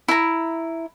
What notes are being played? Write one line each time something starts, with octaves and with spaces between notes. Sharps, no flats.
E4 A#5